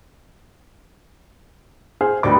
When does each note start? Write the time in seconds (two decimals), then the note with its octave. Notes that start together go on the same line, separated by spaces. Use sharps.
2.01 G#4 C5 F6
2.23 D2 D#3 G3 B3 D5 D6